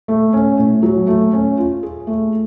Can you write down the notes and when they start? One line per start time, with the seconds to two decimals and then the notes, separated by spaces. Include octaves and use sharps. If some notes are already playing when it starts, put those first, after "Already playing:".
0.08 A3
0.33 C#4
0.58 A2
0.83 F#3
1.07 A3
1.33 C#4
1.58 F4
1.83 G#4
2.07 A3